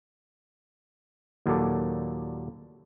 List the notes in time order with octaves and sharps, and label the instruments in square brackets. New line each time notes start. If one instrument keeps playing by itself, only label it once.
[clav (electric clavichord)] D#2 A#2 F#3 A4 D5